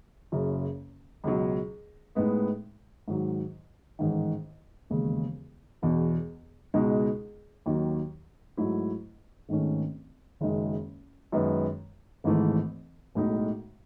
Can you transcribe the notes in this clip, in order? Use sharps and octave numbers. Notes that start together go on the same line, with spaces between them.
F#1 F#2 C#3
C#2 B2 F#3
A2 G#3 B3 D#4
G#2 D#3 F#3
A1 G#2 D#3
E1 D#2 C#3 G#3
E1 E2 B2
C#2 B2 G#3 D#4
D#2 D#3 F#3
G#2 F#3 A3 E4
G#1 G#2 D#3 A3 C#4
F#1 F#2 D#3 G#3
F#2 D#3 G#3 B3
G#1 G#2 E3 A3
B1 A2 G#3 D#4